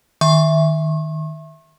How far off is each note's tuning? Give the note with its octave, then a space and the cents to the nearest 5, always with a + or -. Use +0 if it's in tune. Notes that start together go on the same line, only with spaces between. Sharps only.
D#3 +0 E5 +0 C#6 -40